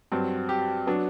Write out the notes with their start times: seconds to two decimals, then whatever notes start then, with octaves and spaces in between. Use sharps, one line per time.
0.12 G2 F#3 C4
0.49 G4
0.87 F#3 B3 D4